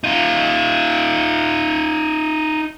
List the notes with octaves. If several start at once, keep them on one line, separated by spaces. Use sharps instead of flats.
D#4 F4